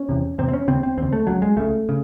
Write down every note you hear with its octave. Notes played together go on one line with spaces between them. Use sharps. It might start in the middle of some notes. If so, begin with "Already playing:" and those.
Already playing: C#4
E2 C3
E2 C3 C4
C4
C#4
D#2 C#3 C4
C4
D#2 C#3 C4
A3
C#2 C#3 F#3
G#3
C#2 C#3 A3
C#3